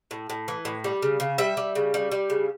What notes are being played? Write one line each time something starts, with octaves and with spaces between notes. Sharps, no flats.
A2
A2
E3
A2
G3
C#3
C#3
G3 E5
G3
C#3
G3
G3
C#3